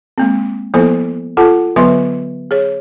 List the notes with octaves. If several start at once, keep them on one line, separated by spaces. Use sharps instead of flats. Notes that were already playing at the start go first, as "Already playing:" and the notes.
G#3 A#3 C4
F3 A#3 B3 E4 A4 C5
F4 A4 F#5 A5
D3 F#3 B3 B4 E5 C6
G#4 C#5